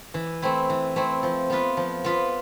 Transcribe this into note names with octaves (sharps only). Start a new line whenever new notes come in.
E3
A3 C4 E4
E3
A3 C4 E4
F3
B3 F4 B4
F3
B3 F4 B4